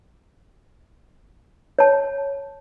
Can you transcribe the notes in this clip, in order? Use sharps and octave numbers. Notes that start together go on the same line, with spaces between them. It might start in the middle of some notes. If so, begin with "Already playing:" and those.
C#5 A5